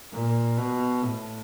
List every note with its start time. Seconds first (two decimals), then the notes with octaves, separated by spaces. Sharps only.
0.13 A#2
0.57 B2
1.03 A2